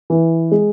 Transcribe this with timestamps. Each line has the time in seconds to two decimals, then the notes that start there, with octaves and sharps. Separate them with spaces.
0.10 E3
0.51 G#3